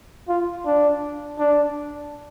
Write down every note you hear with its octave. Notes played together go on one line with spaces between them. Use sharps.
F4
D4
D4